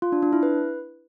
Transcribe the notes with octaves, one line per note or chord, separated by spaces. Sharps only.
F4
D4
D4
E4
B4